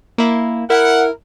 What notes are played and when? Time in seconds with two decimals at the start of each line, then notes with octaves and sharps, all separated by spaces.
0.18 A#3 E4
0.70 E4 A#4 F#5